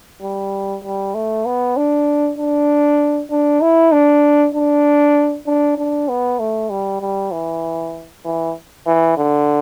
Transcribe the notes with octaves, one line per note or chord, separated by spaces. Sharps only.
G3
G3
A3
B3
D4
D4
D4
E4
D4
D4
D4
D4
B3
A3
G3
G3
E3
E3
E3
D3